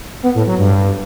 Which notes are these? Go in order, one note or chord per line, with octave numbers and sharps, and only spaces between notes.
B3
A2
F#3
G2